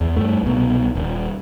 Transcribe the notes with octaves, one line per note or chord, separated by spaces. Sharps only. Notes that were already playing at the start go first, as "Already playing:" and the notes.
E2
G2 A3
C2 B2
D#1